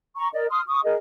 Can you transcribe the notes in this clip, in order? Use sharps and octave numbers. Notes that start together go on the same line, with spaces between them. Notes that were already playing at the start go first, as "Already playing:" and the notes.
A#5 C#6
A#4 D5 D#5
C6 D#6 F6
C#6 D#6
G#4 A#4 D#5